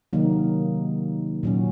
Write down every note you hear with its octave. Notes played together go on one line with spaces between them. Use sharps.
C3 D#3 F#3 A#3 D#4
A#2 F#3 C#4